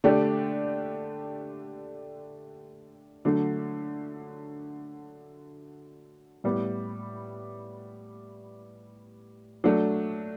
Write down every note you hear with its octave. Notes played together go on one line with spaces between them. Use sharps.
D3 A3 D4 G4 D5
D3 F#3 A3
A2 G3 B3
F#3 A3 D4